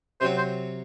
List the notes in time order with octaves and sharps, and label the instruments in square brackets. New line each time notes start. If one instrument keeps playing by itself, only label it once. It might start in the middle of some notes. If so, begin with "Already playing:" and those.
[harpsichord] C3 F#3 C4 [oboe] C5
[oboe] C5